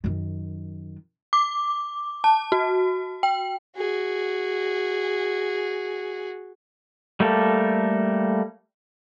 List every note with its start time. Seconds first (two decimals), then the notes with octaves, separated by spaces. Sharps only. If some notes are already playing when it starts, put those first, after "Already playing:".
0.04 F#2 D#3
1.33 D6
2.24 A5
2.52 F#4
3.23 G5
3.76 F#4 G#4
7.20 G3 A3 A#3 G4 A4